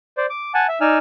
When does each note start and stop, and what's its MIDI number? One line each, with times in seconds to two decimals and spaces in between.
0.18 0.26 72
0.18 0.26 74
0.30 0.52 86
0.54 0.67 78
0.54 0.67 80
0.54 0.67 81
0.68 0.79 76
0.81 0.99 63
0.81 0.99 74
0.81 0.99 80
0.81 0.99 88
0.81 0.99 89